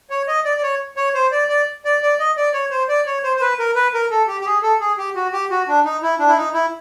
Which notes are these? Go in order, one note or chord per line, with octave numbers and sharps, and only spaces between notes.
C#5
D#5
D5
D5
C#5
C#5
C5
D5
D5
D5
D5
D#5
D5
C#5
C5
D5
C#5
C5
C5
B4
A#4
B4
A#4
A4
G4
G4
G#4
A4
G#4
G4
F#4
G4
F#4
D4
D#4
E4
D4
E4
D#4
E4